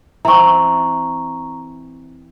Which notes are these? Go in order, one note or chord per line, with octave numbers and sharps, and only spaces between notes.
E3 C4 A#5 C#6